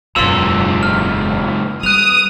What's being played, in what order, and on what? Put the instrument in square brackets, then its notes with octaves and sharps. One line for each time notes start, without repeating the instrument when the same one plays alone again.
[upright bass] E1 F#2 [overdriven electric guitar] C#2 A#2 [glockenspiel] C6 E6
[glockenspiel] F6
[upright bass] G3 [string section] D#6 [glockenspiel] F#6 F7